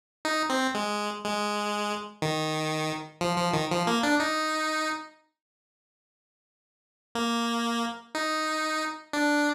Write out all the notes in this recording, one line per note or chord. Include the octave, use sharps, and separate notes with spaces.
D#4
C4
G#3
G#3
D#3
F3
F3
D#3
F3
A#3
D4
D#4
A#3
D#4
D4